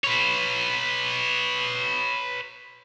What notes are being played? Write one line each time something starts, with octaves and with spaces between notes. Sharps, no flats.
B4 C#5